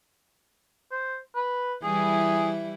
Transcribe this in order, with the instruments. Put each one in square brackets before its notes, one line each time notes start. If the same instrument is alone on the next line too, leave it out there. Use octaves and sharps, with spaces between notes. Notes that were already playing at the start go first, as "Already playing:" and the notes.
[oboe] C5
B4
[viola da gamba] E3 G3 E4 [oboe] G#4